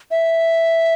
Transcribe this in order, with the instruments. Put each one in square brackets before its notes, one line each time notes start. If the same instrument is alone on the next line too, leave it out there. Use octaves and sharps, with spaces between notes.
[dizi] E5